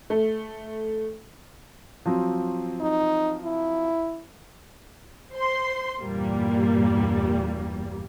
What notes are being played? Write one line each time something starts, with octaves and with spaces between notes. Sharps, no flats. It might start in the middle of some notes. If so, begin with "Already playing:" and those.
A3
F3 F#3 C4
D#4
E4
C5 C6
E2 G2 A#2 G3 A#3